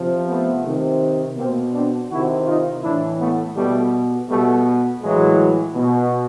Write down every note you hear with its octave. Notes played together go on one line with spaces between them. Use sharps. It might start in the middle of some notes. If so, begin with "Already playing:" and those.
Already playing: C3 F3
A3 B3
C3 D#3
B2 A#3 C4
C4 D4
C3 D#3 E4 F#4
D#4 F4
A2 E3 D4 E4
A3 B3
B2 G3 A3
B2 G3 A3
A2 E3 F#3 G#3
B2